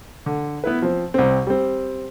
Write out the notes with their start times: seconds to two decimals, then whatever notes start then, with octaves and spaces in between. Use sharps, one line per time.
0.26 D3
0.64 B3 E4 B4
0.82 F3 C4
1.14 C2 C4
1.47 G3 C4